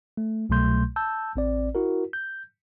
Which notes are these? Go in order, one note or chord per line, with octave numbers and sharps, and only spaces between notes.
A3
C2 B2 F#3 A3 C6 G6
A5 E6 G6
A1 C4 D5
E4 F#4 A#4
G6